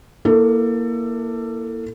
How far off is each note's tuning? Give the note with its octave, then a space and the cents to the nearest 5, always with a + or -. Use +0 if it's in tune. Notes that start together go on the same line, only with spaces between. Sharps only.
A#3 +10 E4 +0 A4 +25